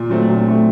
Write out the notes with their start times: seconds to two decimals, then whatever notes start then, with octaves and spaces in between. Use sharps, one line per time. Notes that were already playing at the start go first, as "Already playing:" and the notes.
Already playing: A#2
0.09 F#3 A3 C4
0.28 A#2
0.47 F#3 A3 C4